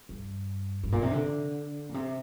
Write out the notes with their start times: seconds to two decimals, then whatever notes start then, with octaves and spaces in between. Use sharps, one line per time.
0.09 G2
0.84 G2
0.92 A#2
1.02 C3
1.11 D3
1.89 A#2
1.94 C3